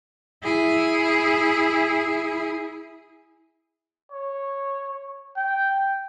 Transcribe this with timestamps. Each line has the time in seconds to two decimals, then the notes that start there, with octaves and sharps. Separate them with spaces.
0.44 E4 G#4
4.12 C#5
5.36 G5